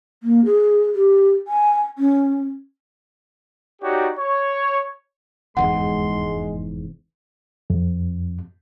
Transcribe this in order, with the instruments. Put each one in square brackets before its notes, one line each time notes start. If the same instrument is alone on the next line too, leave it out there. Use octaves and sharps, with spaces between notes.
[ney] A#3
G#4
G4
G#5
C#4
[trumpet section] D#4 F#4 G4 C#5 D5
C#5 C#6
[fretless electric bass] F1 E2 G#2 [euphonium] G#3 [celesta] F#5 [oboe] C6
[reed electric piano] F2